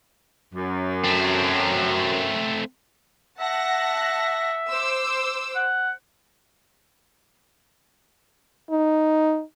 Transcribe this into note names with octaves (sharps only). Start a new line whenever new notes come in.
F#2
A3 C4
E5 F#5 A5 A#6
C5 D6 E6
F#5
D#4